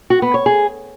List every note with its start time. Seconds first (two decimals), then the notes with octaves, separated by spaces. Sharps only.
0.10 F#4
0.22 B3
0.34 C#5
0.46 G#4